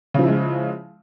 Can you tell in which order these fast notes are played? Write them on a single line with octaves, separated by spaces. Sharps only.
C#3 F3 E4 G#3